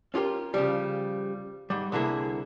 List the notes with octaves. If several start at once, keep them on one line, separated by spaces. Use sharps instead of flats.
C#4 F4 G4 G#4 A#4
C#3 F3 G3
G#2 G3
C2 D3 A#3 E4 G#4 E5